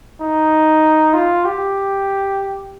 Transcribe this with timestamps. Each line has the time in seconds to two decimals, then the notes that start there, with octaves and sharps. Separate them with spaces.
0.21 D#4
1.14 F4
1.45 G4